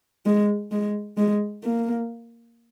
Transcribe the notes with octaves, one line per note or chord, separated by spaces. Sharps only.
G#3
G#3
G#3
A#3